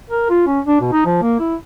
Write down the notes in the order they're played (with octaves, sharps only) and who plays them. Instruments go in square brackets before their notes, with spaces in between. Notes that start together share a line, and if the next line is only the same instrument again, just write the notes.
[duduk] A#4
F4
C#4
D4
B2
D#4
F3
A#3
E4